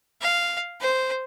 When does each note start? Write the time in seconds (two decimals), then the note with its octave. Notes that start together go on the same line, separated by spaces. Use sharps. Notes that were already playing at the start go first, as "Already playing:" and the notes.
0.21 F5
0.81 C5